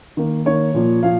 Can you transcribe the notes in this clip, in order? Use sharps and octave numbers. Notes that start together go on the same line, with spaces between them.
D#3 A#3
D#3 A#3 C#5
A#2 F3 A#3
A#2 F3 F5